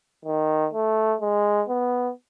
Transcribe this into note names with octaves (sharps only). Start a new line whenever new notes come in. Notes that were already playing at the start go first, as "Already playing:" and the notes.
D#3
A3
G#3
B3